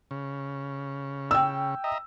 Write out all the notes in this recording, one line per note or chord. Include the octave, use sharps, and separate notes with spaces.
C#3
G5 E6
D#5 E5 A#5